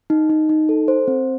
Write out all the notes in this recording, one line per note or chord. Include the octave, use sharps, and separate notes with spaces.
D#4
D#4
D#4
A4
C5
C4